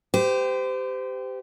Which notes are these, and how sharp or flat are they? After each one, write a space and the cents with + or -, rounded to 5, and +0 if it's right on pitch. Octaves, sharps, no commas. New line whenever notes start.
G4 +0 C5 -35